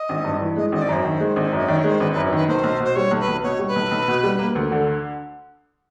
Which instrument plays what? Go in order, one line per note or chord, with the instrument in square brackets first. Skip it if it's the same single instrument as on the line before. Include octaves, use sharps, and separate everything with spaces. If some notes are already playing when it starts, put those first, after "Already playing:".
Already playing: [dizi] D#5
[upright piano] G#1
G2
E3
[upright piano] G#3 [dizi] D#5
[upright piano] G#1 [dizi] D#5
[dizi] D5
[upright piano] F#2 [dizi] C5
[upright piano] D#3
G#3
G#1
[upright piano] F#2 [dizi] D#5
[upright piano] D#3 [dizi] D5
[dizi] C#5
[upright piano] G#3
[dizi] C5
[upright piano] G#1 [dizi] B4
[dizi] B4
[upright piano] F#2
[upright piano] D#3 [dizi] B4
[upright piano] B1 [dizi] C5
[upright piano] B1
[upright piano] B2 [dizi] C5
[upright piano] G3 [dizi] C#5
[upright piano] B1
[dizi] B4
[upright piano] B1
[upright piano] B2 [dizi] C#5
[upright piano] G3
[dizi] B4
[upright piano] B1
B1
B2
G3
A#3
D2
D3